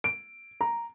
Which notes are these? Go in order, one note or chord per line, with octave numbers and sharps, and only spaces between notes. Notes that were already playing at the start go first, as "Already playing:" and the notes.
D7
A#5